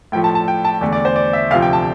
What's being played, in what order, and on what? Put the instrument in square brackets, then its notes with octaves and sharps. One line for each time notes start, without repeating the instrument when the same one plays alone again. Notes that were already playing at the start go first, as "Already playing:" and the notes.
[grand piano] A2 F3 A3 G5
A5
A5
G5
A5
E2 D3 A3
D5
C5
D5
E5
D2 C3 F3 F5
G5
A5